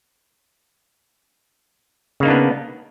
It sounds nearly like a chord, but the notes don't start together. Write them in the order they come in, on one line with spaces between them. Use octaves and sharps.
C#3 A#3 D#4 D4 B3